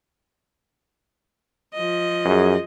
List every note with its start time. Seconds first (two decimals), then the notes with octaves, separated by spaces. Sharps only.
1.75 F3 D#5
2.25 F#2 G#4